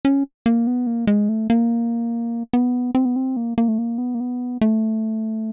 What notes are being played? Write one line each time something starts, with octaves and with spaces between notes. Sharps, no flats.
C#4
A#3
B3
A#3
G#3
A3
A#3
B3
C4
B3
C4
A#3
A#3
A3
A#3
B3
A#3
B3
A3